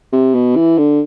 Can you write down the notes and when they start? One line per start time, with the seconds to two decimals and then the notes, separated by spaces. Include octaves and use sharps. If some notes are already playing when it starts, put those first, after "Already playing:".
0.12 C3
0.34 B2
0.56 E3
0.78 D3